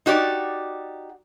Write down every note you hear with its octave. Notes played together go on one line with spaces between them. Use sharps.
D#4 F#4 G4 D5